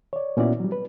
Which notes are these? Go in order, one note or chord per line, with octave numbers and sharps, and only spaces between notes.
C#5 D5
A#2 B3 C#4 E4 F#4 D5
F#3 G3
B4